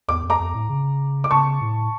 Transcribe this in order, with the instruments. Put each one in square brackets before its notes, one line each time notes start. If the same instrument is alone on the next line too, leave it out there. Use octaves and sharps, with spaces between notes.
[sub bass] E2 [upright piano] D6
[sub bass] F2
[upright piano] A#5 D6
[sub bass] F2
A2
C#3
[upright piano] D6
[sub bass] C#3 [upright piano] A5 C#6
[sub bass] A2